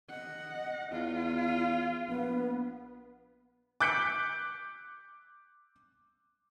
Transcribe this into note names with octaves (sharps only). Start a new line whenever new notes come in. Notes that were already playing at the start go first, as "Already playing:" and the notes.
D#5 F#5
E2 F4
F5
A#1 B3
D6 F#6 G6 B6 C#7 D7